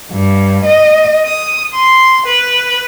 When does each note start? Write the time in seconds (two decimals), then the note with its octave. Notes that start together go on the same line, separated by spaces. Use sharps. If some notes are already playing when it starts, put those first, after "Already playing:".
0.11 G2
0.65 D#5
1.25 D#6
1.74 C6
2.26 B4